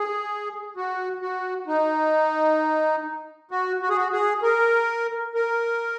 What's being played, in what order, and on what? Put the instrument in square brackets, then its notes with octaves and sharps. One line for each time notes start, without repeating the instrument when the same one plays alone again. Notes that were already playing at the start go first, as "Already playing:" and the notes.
Already playing: [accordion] G#4
F#4
F#4
D#4
F#4
F#4
G#4
F#4
G#4
A#4
A#4